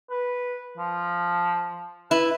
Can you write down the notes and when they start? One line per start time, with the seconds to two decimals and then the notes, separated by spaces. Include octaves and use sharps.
0.10 B4
0.77 F3
2.11 E4 B4